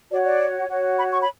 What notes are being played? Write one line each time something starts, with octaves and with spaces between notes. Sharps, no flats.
F#4 C#5 D5
D5
F#4 C#5
B5
C#6
B5